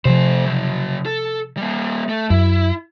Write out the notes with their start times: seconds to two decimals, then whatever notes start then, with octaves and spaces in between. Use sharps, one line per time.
0.05 C3 F3 A3 C5
0.46 C#3 F#3
1.06 A4
1.57 G3 A#3
2.09 A3
2.30 F#2 E4